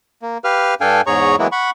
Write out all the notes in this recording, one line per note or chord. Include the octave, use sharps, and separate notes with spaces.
A#3
G4 B4 F5 F6
G2 D4 A4 F5 G5 G#5
E2 G#2 G#4 C#5 A#5 C#6
E3 F#3 G#3 A#3 B3 E4
F#5 B5 C#6